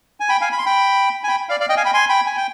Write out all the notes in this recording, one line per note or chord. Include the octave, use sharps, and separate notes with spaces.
G#5
G5 B5
F5 G#5
B5
C6
G5 B5
G#5
G5 B5
D5 F5
D5 F5
D#5 G5
F5 G#5
G5 B5
G#5 C6
G5 B5
G#5
G5